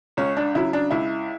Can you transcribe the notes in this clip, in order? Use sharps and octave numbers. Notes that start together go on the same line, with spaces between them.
C#2 C#4
D4
C#3 F#3 E4
D4
C#2 E4